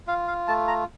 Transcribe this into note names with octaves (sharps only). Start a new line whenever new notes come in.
F4 F5
F5
A3 A5
A#5